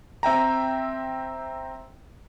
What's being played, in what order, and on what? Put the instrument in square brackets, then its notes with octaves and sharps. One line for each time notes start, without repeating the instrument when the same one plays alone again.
[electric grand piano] C4 E5 G5 A#5